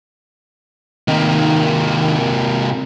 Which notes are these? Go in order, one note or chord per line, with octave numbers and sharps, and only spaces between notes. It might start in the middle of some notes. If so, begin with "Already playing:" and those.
C3 D#3 A#3